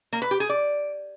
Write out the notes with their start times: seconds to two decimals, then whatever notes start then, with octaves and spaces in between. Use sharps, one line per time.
0.13 A#3
0.22 B4
0.31 G4
0.40 G#4
0.49 D5